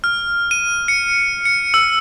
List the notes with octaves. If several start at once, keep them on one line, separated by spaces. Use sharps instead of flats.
F6
D#7
C#7
C#7
E6